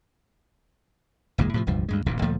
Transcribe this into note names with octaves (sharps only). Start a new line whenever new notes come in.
F#1 D#2 A#2 G#3
A2 C3 E3 F3
E1 C#2 G2 F3
D2 G2 G#3
D1 A#1 E2 C3
D2 A#2 F3 A3